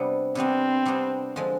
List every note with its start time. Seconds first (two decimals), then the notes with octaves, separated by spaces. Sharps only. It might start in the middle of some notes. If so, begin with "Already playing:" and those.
Already playing: C3 G3 B3 D4
0.35 C3 G3 B3 C4 D4
0.85 C3 G3 B3 D4
1.36 D3 F3 G#3 C4